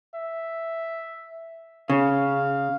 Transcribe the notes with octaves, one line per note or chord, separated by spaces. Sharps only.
E5
C#3 F5